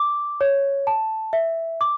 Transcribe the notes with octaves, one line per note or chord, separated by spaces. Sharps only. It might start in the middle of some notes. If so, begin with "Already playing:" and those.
Already playing: D6
C#5
A5
E5
D6